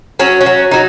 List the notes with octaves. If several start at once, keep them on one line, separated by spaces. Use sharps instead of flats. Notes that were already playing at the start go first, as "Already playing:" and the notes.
F#3 C#4
C#4
F#3
F#3 D#4